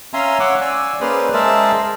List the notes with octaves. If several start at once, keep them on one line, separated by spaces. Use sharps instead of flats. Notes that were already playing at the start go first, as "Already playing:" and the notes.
C#4 E5 F5 G#5 A#5 C6
C#5 F#5 D6 E6
D5 G#5 E6
A#3 C#4 G#4 B4 C5 D5
G#3 G#4 A#4 C5 E5 A5